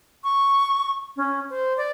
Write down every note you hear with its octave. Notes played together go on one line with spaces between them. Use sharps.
C#6
C#4
C5
D5